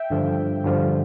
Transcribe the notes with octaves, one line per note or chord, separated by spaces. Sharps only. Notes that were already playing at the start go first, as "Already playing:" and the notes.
Already playing: E5 G5
G2 D3 F3
G2 D3 F3